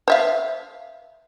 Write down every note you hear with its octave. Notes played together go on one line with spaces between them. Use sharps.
C5 E5 F5